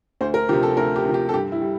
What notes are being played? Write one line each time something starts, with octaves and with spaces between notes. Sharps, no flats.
D2 C5
A#4
C3 F3 G4
A4
D2 A#4
G4
C3 F3
G4
A4
G2 G4
E4
G3